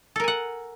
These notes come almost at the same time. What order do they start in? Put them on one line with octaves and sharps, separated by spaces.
A4 A#4 G#5 F#5